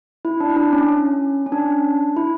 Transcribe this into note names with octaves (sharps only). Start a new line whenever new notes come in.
E4
D4
E4
D4
C#4
C#4
C#4
D4
E4